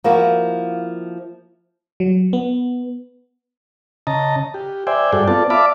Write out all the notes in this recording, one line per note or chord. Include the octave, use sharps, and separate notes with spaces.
F3 A#3 E4 F#4
F#3
B3
C#3 D#5 A5 A#5
G4
C5 D5 E5 G5 G#5
G2 F#4 G#4 A4 D5 G5
B3 C4 F4 A4 D5 A5
D5 E5 F5 A5 B5 D6